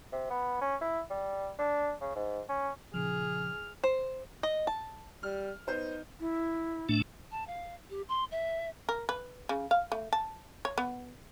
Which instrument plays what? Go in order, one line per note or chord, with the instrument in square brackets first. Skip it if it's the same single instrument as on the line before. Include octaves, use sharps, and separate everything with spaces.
[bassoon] C3
B3
C#4
E4
G3
D4
C#3
G#2
C#4
[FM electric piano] A#2 C#3 F3 [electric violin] G#4 [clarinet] F6
[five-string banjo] C5
D#5
A5
[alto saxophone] G3 [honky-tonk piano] F6
[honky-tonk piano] B3 C5 G6 [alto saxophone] D#4
[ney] E4
[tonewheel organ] A2 A3 D4
[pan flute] A5
F5
G4
C6
E5
[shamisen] A#4
B4
C#3
F5
A3
A5
C#5
B3